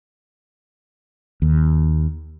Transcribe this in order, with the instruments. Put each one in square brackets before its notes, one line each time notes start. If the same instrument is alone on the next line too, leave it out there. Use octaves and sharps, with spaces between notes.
[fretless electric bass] D#2